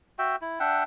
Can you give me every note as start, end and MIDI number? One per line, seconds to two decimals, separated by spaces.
0.19 0.36 66
0.19 0.36 76
0.19 0.36 79
0.41 0.59 64
0.60 0.84 62
0.60 0.84 76
0.60 0.84 78
0.60 0.84 79